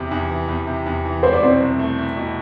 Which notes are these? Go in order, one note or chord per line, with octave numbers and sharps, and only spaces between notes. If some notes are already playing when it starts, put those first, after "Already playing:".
Already playing: E2 C3
E2
E3
E2
C3
E2
E3
E4 C5
D5
B2 C4 C5
C2
A3
E4
B2